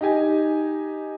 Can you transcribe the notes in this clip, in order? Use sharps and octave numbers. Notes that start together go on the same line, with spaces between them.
D#4 G4 G#5